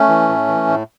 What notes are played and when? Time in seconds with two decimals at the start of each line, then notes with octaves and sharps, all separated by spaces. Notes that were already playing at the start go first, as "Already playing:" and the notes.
Already playing: A3 C#4
0.08 E3
0.28 A2
0.48 E3
0.68 A2